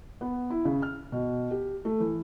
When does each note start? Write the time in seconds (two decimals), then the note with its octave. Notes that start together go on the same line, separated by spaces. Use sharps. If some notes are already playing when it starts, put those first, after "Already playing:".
0.21 B3
0.50 E4
0.65 C#3
0.82 F6
1.12 B2
1.51 G4
1.85 A3
2.00 E3